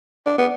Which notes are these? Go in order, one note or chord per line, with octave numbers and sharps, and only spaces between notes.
D4
B3